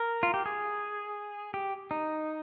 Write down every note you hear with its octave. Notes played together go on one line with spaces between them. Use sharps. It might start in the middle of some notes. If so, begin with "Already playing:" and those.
Already playing: A#4
F4
G4
G#4
G4
D#4